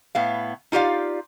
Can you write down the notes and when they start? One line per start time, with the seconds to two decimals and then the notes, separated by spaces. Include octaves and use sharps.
0.15 A2 B3 F5
0.72 D#4 F4 G4 D5 F5